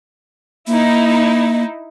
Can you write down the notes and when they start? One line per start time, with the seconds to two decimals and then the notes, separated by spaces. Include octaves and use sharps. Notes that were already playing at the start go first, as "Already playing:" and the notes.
0.67 A#3 D#4 E4